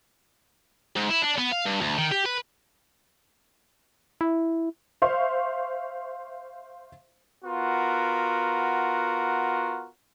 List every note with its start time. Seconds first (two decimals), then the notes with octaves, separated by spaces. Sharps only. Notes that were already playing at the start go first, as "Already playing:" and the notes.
0.96 G#2
1.09 E4
1.22 D4
1.38 B3
1.52 F5
1.66 G2
1.81 D2
1.98 D#3
2.12 G4
2.26 B4
4.21 E4
5.02 C5 E5 F5 C6 C#6
7.45 B3 F4 F#4 A#4